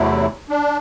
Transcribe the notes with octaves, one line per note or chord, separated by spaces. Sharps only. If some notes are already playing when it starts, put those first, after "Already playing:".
Already playing: E2 C3 F#3 A3 E4
D4